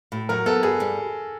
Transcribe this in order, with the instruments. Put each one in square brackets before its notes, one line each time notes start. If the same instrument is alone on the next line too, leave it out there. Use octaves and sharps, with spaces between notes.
[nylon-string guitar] A2
[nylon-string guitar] F#3 [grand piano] A#4
[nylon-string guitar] B3 [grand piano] A4
[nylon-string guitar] G2 [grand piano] G#4
[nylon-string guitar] G3